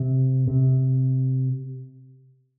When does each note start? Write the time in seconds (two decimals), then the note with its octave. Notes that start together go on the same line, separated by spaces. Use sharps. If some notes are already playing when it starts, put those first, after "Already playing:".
Already playing: C3
0.47 C3